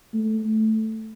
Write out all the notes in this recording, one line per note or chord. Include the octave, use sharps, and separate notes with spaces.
A3